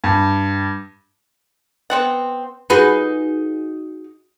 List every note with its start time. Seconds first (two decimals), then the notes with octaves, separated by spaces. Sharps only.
0.04 G2
1.90 B3 C4 F#5
2.70 D#4 F#4 G#4 B4